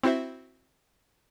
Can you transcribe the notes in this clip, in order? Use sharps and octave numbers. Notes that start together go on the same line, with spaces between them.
C4 E4 F#4 C5 E5